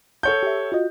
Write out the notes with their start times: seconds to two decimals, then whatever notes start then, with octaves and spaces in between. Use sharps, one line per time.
0.23 A4 C#5 F#5 G6
0.43 G4 E5
0.72 F4 F#4 D#5